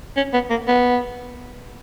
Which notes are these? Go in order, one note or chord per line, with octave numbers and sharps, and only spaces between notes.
C#4
B3
A#3
B3